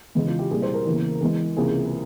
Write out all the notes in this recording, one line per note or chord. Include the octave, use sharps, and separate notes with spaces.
E2 C#3 E3 G#3
F4
G4
C2 A#2 G3 A#3 G#4
C5
A#4
E2 C#3 E3 A#3
E2 E3 G#3 G#4
C#2 C3 E3 A#3 G#4